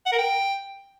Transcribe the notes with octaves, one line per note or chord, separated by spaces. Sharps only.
F#5
A#4
G5